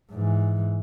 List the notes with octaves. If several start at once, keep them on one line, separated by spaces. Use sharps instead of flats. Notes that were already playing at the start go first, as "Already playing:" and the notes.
G#2 E3